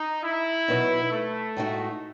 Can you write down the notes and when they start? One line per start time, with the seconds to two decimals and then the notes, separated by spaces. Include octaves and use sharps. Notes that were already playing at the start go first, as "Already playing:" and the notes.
Already playing: D#4
0.23 E4
0.68 B2 F#3 B3 D#4
1.12 A3
1.57 A2 G#3 D#4 F#4